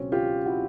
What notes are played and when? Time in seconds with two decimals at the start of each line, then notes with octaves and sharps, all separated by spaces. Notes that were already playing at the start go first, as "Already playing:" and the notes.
Already playing: C#2 B2 F#3 C4 C#4
0.12 F4 G4
0.46 E4 F#4